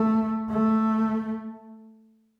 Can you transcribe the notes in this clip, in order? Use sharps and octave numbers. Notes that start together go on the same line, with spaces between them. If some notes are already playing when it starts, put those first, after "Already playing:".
Already playing: A3
A3